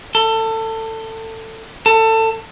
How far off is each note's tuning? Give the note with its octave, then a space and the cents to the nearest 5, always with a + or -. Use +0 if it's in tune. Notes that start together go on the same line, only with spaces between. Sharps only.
A4 +25
A4 +25